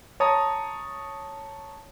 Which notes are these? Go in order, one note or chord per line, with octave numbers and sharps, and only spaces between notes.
C#5 A5 A#5 D#6